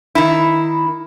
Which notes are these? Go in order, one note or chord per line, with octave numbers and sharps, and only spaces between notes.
D#3 E4